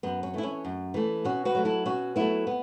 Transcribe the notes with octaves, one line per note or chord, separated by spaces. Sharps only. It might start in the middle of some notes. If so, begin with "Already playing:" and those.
F#2 B3
C#4
E3 A3 E4
C#4
F#2
E3 A3
B2 C#4 F#4
F#4 B4
F#3 A3
E4 A4
B2 C#4 F#4
F#3 A3 B3 E4
B3